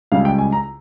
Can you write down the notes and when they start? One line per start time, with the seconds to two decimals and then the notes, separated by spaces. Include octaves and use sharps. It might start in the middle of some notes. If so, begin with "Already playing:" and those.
0.12 C#2 C#3 G3 F5
0.25 G5
0.38 G#5
0.52 A#5